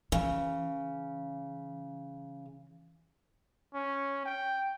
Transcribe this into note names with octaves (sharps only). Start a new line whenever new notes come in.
C#3 E3
C#4
G5